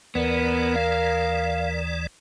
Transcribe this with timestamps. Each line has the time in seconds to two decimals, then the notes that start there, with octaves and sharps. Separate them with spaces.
0.15 D#2 E3 B3 A#4 D5
0.76 F5